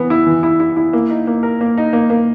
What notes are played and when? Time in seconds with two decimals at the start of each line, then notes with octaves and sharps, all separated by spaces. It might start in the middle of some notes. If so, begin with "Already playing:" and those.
Already playing: E3 B3
0.10 E4
0.27 E3
0.43 E4
0.60 E4
0.77 E4
0.93 A#3
1.10 D#4
1.27 A#3
1.43 A#4
1.61 A#3
1.77 D#4
1.93 A#3
2.10 A#3